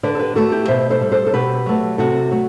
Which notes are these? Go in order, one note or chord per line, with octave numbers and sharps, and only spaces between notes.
D3 B4 D5
A4
G4 B4
A3 F#4 A4
E4 G4
B2 C5 E5
A4 C5
G3
A4 C5
A4
B2 G4 B4
F#3 A3
C3 F#4 A4
F#3 A3